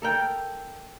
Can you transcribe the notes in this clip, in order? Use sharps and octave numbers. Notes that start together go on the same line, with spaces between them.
A4 A#4 G5